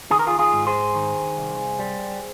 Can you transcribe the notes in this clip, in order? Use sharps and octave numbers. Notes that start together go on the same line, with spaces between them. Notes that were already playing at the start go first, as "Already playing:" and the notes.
D#3 G#4
A#4
F4 G#4
F4 G#4
G#2
G#4 C5
D#3
C2
G3